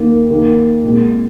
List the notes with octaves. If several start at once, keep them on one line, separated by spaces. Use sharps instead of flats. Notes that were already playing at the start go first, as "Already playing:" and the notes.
Already playing: D#2 D#3 A#3
D#2 D#3 A#3
A#2 G#3 C4